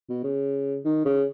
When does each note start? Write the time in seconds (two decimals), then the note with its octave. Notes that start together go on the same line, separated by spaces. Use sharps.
0.09 B2
0.24 C#3
0.85 D#3
1.05 C#3